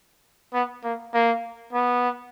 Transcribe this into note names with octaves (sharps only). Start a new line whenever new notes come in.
B3
A#3
A#3
B3